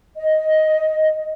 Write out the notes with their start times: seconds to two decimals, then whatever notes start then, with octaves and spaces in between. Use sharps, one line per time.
0.17 D#5